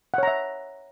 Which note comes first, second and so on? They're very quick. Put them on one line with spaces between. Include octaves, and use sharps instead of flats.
F#5 C#5 A#5 E5